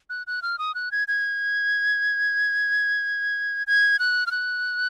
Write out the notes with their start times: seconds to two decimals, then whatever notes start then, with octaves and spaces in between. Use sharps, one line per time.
0.10 F#6
0.27 F#6
0.42 F6
0.59 D#6
0.75 F#6
0.92 G#6
1.08 G#6
3.67 G#6
3.99 F#6
4.26 F6
4.31 F#6